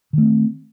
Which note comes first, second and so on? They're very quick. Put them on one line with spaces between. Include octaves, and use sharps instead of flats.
D#3 A3 C4